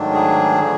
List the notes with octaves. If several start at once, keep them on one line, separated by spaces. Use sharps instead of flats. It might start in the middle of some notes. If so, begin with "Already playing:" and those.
Already playing: G#2 D#3 F#3 A3 D4
G#4
D3 F3 A3